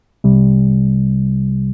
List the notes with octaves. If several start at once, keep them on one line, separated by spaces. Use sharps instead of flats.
C2 C3 G3